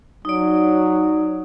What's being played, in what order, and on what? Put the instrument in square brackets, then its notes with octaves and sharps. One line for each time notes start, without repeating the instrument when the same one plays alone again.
[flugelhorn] F#3 [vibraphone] D#4 D5